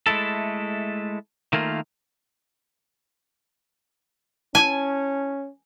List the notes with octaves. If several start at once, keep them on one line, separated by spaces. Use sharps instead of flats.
G#3 A3 E4 A4
D#3 A3 A#3 F4
C#4 E4 G#5 A5